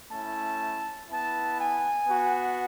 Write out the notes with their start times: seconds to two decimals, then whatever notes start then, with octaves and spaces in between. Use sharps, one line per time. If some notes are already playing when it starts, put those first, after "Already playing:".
0.11 A3 C#4 E4 A5
1.09 B3 E4 A5
1.58 G#5
2.07 B3 F#4